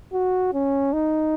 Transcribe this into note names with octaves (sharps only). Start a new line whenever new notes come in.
F#4
C#4
D#4